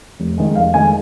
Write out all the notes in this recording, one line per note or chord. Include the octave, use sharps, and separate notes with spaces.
F1
F2 D#3 G#3
F1 F5
F2 D#3 G#3 G#5